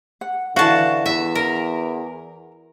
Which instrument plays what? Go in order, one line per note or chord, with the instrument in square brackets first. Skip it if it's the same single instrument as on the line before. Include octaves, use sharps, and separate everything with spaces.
[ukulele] F#5
[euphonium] D3 [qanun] E3 C5 [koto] F#4 A5 [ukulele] F5
[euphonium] E2 [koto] E5
[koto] A#4